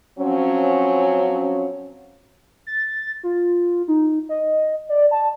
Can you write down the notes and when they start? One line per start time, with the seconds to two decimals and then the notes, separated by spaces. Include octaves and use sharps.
0.18 F3 F#3 C4 C#4
2.67 A6
3.23 F4
3.88 D#4
4.29 D#5
4.89 D5
5.11 A5